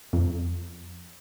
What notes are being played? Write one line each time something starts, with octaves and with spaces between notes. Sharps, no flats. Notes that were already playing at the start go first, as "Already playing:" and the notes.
F2